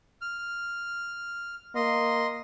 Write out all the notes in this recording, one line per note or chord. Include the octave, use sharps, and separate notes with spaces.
F6
A#3 D#5 C6